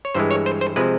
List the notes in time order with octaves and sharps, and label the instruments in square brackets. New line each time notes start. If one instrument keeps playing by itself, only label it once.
[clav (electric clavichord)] C#5
G2 E3 G#3 C5
C#5
C5
C5
C3 F3 G#3 B4